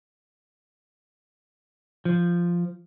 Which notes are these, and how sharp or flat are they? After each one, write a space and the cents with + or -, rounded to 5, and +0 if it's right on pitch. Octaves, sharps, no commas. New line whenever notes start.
F3 -5